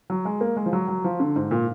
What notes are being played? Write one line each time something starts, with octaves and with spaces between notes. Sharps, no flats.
F#3
G#3
A#3
G#3
F3
F#3
F#3
F3
D3
G#2
A#2